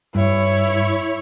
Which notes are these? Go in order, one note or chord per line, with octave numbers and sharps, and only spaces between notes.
G2 E4 C#5